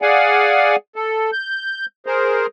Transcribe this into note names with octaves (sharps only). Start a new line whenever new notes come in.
G#4 D5 F5 F#5 G#5
A4
G6
G#4 A#4 C5